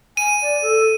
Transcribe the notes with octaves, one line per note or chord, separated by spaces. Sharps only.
G#5 D#7
D5
A4